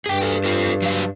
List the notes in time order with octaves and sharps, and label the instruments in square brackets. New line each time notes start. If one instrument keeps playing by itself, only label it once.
[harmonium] G2 [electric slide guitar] G#4 G5
[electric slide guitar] F#4 A4
F4 A4
F#3 F#4 F5